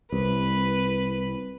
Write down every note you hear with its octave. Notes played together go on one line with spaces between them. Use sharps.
C2 B4